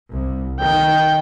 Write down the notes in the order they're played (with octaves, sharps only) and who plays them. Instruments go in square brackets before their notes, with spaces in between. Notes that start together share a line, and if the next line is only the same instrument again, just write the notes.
[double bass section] C2
[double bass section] D#3 [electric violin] G5